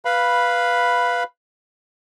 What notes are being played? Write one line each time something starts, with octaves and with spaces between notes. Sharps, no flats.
B4 F5 B5